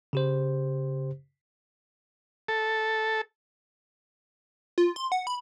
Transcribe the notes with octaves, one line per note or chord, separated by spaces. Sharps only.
C#3 G4 C5
A4
F4
C6
F#5
B5